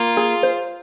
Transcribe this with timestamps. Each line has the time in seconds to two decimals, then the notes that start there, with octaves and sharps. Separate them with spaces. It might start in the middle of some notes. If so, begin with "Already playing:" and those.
Already playing: A#3 F4
0.17 G#4
0.43 C5